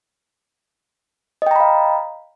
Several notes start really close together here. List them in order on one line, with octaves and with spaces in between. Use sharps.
D#5 G5 A#5 B5 F5